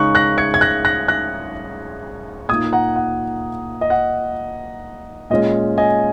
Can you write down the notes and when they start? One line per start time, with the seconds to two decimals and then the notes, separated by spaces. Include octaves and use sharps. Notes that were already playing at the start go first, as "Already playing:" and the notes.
Already playing: C#3 G#3 D#4 C#6 F#6
0.15 F#6 A#6
0.38 G#6 C#7
0.54 G#6
0.61 F#6 A#6
0.85 F#6 A#6
1.08 F#6 A#6
2.49 A#2 D#6 G#6
2.52 A#3 D#4
2.73 F#5 A#5
2.96 F#5
3.81 D#5
3.90 F#5
5.30 A#2 G#3 C#4 D#5
5.78 D#5 G#5